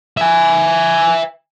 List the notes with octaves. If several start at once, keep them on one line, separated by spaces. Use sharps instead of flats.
E5 G#5